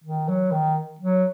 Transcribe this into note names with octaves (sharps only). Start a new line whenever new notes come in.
D#3
F#3
D#3
F#3